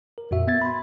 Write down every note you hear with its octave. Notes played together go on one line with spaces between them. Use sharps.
A#4
F2 A#2 F#4 E5
B3 E5 G#6 A6
B5 C6